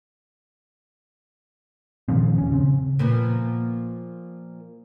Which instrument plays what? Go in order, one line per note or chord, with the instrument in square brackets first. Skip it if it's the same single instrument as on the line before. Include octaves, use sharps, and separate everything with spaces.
[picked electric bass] A#2 D#3 F3 C4
D#1 C#4
C#3 C4
[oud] A#2 F3 B3